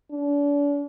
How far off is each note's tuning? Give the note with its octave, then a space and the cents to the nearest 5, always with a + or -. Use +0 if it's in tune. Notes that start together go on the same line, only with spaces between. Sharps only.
D4 -40